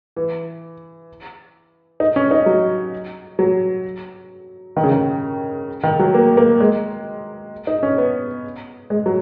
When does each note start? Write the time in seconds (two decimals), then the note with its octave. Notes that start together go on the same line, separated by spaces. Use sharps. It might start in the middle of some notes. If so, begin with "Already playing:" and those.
0.16 E3
2.00 D#4
2.16 C#4
2.31 D#4
2.46 F#3
3.39 F#3
4.77 D#3
4.84 C#3
4.92 D#3
5.84 D#3
5.99 F#3
6.14 A#3
6.37 A#3
6.60 G#3
7.67 D#4
7.83 C#4
7.98 B3
8.90 G#3
9.06 F#3